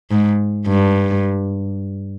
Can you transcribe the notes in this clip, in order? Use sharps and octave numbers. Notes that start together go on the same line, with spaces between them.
G#2
G2